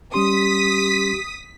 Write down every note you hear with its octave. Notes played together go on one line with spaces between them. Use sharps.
G3 C#4 G4 C6 D#6 B6